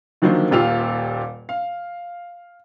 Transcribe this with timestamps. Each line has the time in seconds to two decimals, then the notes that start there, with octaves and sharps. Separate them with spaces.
0.22 D3 D#3 F3 F#3 A#3 C5
0.51 D#1 A#2 F4 G4 E6 F7
1.49 F5